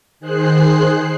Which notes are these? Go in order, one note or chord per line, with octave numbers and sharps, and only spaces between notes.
D#3 G#4 C5 F#6 C7